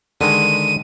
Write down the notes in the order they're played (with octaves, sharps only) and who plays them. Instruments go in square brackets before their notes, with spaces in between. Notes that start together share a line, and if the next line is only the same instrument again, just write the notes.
[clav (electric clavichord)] D3 D#3 G#3 [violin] D#7